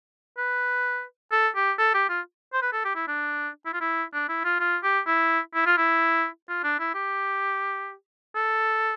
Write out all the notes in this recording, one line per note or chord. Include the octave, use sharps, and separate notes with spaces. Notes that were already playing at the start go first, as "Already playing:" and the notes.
B4
A4
G4
A4
G4
F4
C5
B4
A4
G4
E4
D4
E4
F4
E4
D4
E4
F4
F4
G4
E4
E4
F4
E4
F4
D4
E4
G4
A4